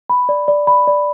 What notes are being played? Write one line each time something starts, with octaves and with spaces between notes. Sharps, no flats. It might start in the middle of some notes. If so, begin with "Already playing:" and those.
B5
D5
D5
B5
D5